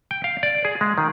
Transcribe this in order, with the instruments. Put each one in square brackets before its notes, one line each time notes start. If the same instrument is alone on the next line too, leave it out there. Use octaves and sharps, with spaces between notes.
[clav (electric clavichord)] G5
F5
D5
G#4
G#3
D#3